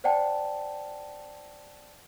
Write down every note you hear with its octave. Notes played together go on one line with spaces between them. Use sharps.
C5 D5 F#5 G5 A5